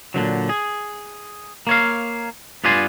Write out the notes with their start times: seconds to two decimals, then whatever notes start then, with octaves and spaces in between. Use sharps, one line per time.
0.14 A#2 D3 D#3 F#3
0.49 G#4
1.67 A#3 C#5 F5
2.64 G2 B3 F4 D5 G#5 C6